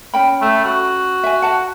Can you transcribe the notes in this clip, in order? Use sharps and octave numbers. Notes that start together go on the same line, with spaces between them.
C#4 G5 B5
A3
F#4
E5 G#5
F#5 A5